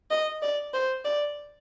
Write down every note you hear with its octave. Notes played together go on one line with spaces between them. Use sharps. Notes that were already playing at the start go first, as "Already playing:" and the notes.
D#5
D5
C5
D5